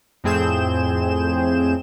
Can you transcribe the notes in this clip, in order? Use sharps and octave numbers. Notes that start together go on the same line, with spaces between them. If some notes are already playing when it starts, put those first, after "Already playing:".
F2 A2 C4 G#4 G6 E7